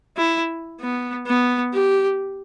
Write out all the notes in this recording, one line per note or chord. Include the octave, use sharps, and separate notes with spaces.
E4
B3
B3
G4